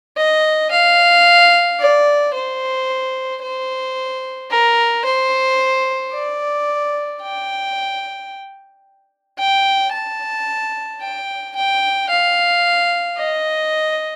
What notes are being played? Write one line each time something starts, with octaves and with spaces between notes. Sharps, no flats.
D#5
F5
D5
C5
C5
A#4
C5
D5
G5
G5
A5
G5
G5
F5
D#5